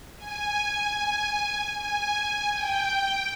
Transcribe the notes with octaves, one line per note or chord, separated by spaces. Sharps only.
G#5
G#5
G5